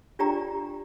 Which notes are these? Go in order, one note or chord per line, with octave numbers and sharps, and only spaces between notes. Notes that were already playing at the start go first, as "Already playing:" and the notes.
D4 F4 G4 D5 G5 A#5